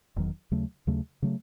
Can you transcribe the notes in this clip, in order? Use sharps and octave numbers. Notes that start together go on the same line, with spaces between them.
E1 E2 D#3 F#3
D#2 C#3 F#3 A3
D#2 C#3 F#3 A3
C#3 F#3 A3